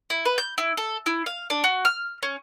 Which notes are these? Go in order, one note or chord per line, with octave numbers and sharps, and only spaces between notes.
E4
B4
G6
E4
A4
E4
F5
D4
F#4
F6
C#4